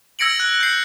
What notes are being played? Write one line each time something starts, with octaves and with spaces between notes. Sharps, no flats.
E6 G#6 A#6 C#7 D7 F#7
F#6
G6 C7